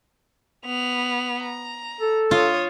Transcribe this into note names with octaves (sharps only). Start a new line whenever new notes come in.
B3 F7
A#5
A4
F4 C#5 D#6